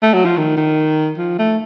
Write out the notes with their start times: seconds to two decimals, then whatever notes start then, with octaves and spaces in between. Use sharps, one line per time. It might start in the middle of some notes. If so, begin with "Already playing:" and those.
0.02 A3
0.14 F#3
0.25 F3
0.37 D#3
0.57 D#3
1.18 F3
1.39 A3